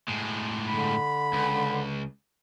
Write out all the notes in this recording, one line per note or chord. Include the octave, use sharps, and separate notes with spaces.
A2 G#3
D3 B5
C#2